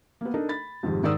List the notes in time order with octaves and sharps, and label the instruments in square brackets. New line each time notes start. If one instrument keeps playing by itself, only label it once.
[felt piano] A#3 B3
D4 D#4 A4 A#4 D#5
B5 A6
F2 G#2 C3 D#3 G3
G#2 D#3 A#4 D5 D#6 E6